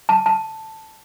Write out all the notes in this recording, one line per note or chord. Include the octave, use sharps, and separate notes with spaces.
A5
A5